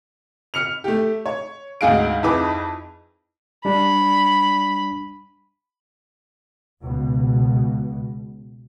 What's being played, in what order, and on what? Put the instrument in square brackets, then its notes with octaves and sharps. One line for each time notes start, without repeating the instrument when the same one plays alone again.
[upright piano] F6 C#7 F7
A3 G4
C#5
D2 G#2 F#4 G#4 F5 D7
F2 D#4 E4 G#4 B4 D6
[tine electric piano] G3 D4 [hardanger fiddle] B5
[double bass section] C#2 B2